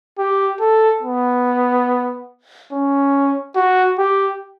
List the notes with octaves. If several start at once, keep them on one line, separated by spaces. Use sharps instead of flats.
G4
A4
B3
C#4
F#4
G4